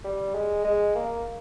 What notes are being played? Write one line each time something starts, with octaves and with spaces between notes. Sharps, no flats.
G3
G#3
G#3
A#3